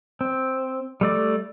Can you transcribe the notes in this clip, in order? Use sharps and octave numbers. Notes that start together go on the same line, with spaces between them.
C4
G3 A3 D5